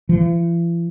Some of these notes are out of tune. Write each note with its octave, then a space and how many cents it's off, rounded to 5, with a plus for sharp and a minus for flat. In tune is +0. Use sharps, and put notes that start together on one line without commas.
E3 +45